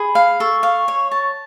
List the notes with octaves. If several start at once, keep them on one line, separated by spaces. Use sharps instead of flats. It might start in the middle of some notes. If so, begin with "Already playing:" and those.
Already playing: G#4 B5
F5
A4 C#6
F5
C#5
A5